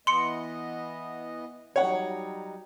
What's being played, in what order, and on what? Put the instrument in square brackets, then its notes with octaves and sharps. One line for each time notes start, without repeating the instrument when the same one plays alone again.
[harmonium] E3 B3 D#5 [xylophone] C6 C#7
[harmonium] F#3 G3 D#4 [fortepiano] C#5 F#5